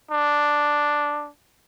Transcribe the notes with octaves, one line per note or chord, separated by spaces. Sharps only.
D4